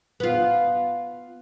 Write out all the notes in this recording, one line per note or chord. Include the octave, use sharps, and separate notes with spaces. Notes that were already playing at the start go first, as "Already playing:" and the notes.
B3 F4